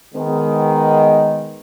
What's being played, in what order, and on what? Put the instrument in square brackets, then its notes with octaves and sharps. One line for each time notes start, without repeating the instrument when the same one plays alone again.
[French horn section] D#3 G#3 B3